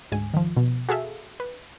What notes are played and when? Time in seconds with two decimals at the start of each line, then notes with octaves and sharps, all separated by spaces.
0.12 D2 G#2 G#5
0.34 D#3 F3
0.57 B2
0.89 F#4 G#4 A4 E5 F5
1.40 B4